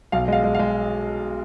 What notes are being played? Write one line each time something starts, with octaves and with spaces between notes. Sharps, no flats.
B1 F5
G#3 F5
G#3
F5
G#3